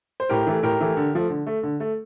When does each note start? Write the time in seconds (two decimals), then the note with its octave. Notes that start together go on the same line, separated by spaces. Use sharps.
0.20 C5
0.29 A2 G4 A#4
0.47 E3 A3
0.63 A2 G4 A#4
0.81 E3 A3
0.97 D3
1.14 F3 A3
1.30 D3
1.47 A3
1.63 D3
1.80 A3